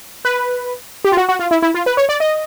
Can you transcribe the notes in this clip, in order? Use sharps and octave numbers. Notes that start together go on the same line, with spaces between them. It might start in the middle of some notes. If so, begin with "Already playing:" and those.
B4
G4
F4
F#4
F#4
F4
E4
E4
F4
B4
C#5
D5
D#5